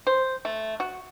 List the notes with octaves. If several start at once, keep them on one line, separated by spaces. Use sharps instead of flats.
C5
A3
F#4